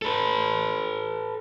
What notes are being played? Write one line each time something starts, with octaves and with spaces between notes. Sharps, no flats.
A4 B4